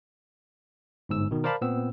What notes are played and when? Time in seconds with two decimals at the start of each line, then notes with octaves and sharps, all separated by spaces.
1.09 G1 G#2 E6
1.31 B2 D#3
1.44 A#4 C5 D5 F5 A5 B5
1.61 A#2 B3 C4 E6